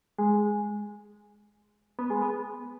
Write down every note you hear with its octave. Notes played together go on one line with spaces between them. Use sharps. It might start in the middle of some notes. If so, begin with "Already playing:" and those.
G#3
B3
G#3
B3